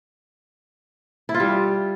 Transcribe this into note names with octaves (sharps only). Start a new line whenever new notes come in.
E4
F4
G3